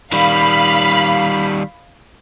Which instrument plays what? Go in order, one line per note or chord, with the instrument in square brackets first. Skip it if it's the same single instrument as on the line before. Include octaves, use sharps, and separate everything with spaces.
[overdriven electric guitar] D#3 G3 [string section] F5 B5